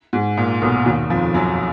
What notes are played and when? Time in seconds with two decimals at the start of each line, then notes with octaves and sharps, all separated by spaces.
0.13 G#2
0.37 A#2
0.62 B1 B2
0.86 D#2 D#3
1.10 F2 F3
1.34 F#2 F#3